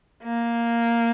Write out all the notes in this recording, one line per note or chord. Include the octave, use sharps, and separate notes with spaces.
A#3